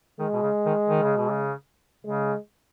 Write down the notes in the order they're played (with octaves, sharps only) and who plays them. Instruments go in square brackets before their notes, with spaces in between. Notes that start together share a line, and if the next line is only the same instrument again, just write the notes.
[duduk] D#3 [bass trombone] G#3
[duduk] B2
C#3
D#3
D#3
C#3
B2
C#3
[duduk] C#3 [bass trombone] G#3